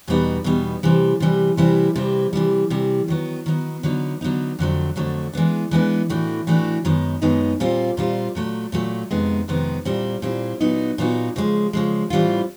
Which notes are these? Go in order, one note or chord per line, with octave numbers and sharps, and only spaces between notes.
E2 B2 G3 B3 D#4
E2 B2 G3 B3 D#4
C3 E3 G3
C3 E3 G3
C3 E3 G3 C4 E4
C3 E3 G3 C4 E4
C3 E3 G3
C3 E3 G3
D#3 F#3 B3
D#3 F#3 B3
D3 F#3 B3 D#4
D3 F#3 B3 D#4
F2 D3 F#3 A3
F2 D3 F#3 A3
E3 G#3 B3 D4
E3 G#3 B3 D4
A2 E3 A3 D4 F#4
A2 E3 A3 D4 F#4
F#2 D#3 G#3 B3 D#4
F#2 D#3 G#3 B3 D#4
A#2 G3 C4 F4
A#2 G3 C4 F4
A#2 F#3 A3
A#2 F#3 A3
F2 C3 D#3 G#3 B3
F2 C3 D#3 G#3 B3
A#2 G3 C4 E4
A#2 G3 C4 E4
A#2 F#3 B3 D#4 F#4
A#2 F#3 B3 D#4 F#4
C#3 F3 G#3
C#3 F3 G#3
A2 E3 G3 C4 F4